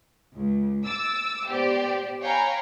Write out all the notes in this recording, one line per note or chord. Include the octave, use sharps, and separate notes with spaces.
C#2
D6 E6 A6
B3 G4 C5 D5
C#5 F5 G5 G#5 A#5 B5